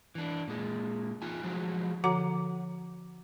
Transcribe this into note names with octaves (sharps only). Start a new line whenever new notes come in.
E3 D4
A#2 G#3
D#4 F4 G#5
F3 F#3 G#3 F#4
D3 F3 F#4 F#5 A#5 D6